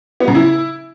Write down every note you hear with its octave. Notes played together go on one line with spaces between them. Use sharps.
B3
C#3
E4